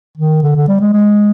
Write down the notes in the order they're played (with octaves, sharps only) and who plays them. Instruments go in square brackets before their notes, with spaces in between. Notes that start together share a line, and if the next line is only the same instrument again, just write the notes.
[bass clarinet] D#3
D3
D3
G3
G#3
G#3